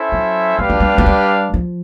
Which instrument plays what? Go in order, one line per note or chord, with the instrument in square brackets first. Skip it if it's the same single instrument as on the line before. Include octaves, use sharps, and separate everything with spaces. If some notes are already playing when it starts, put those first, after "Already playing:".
Already playing: [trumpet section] C#4 E4 A4 C5 E5
[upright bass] F#3
[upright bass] G3 [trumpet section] D4 G4 B4 D5 F5
[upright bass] F#3
G3
F#3
G3
F3